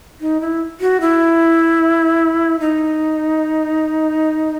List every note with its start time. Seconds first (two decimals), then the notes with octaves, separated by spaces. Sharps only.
0.21 D#4
0.41 E4
0.81 F#4
1.01 E4
2.60 D#4